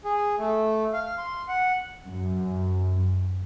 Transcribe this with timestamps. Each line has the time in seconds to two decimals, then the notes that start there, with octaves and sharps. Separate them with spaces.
0.05 G#4
0.38 A3
0.93 F5
1.18 C6
1.48 F#5
2.06 F#2